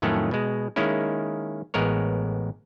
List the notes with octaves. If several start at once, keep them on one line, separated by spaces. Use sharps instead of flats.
F2 A2 D#3 F#3 A3 C#4
B2 G#3
D#3 G#3 A#3 C#4 E4
A1 G#3 B3 A#4 C#5